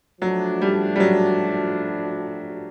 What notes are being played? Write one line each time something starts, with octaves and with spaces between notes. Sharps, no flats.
F3 F#3 A3 D4 F#4
G3
G3
F#3